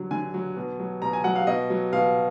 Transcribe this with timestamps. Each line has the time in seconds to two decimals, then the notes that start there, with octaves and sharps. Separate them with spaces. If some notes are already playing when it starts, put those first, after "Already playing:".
Already playing: D3 F#3
0.11 D3 G#5
0.34 F#3
0.57 B2
0.79 F#3
1.02 B2 A#5
1.13 G#5
1.24 F#3 F#5
1.36 F5
1.47 B2 D#5
1.70 F#3
1.93 B2 F5